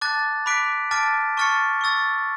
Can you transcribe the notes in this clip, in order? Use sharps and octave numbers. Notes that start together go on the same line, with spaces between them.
A5 D6 F#6 A6
B5 D6 F#6 B6 D7
A5 D6 F6 A6 D7
A5 C#6 F6 A6 C#7
C#6 E6 A6